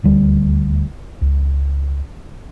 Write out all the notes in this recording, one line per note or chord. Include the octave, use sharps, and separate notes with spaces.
D#1 D2 G3
C#2